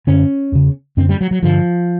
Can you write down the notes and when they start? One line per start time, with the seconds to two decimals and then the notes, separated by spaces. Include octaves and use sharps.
0.07 F#2 D3 C#4
0.52 E2 C#3
0.97 F#2 D3 C4
1.09 G3
1.21 F#3
1.31 F#3
1.43 G2 D3 F3